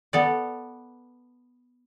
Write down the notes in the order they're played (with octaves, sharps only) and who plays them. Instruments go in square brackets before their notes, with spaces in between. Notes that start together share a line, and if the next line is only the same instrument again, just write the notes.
[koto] B3 A4 D5